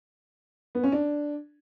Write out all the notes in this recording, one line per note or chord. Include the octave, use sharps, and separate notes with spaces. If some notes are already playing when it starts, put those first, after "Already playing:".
B3
C#4
D4